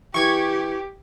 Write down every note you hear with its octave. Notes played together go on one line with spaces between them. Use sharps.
E3 G4 C#6 G#6